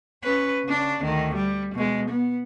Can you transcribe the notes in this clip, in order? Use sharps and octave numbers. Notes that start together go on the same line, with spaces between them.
C#4 B4
C#3 D4
D2 D#3
G3
B2 G#3
B3